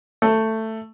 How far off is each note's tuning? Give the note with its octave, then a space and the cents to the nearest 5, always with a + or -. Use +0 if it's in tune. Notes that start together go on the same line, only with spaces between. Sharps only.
A3 +10